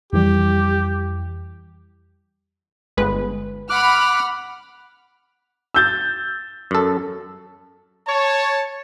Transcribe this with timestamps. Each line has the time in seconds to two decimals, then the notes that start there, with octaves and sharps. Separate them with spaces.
0.13 F2 E3 G3 G4
2.97 G1 G#3 B4
3.70 F#5 B5 D6 F6 F#6
5.74 E6 G6 A6
6.71 F#2 A4
8.08 C#5 A5